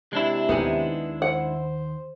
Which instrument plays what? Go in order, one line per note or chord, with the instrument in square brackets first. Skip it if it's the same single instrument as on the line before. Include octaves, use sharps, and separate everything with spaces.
[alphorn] C3 [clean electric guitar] G#3 D4 E4
[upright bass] D#2 D#3 [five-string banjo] B3 D#4 G#4
[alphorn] C5 [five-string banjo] F#5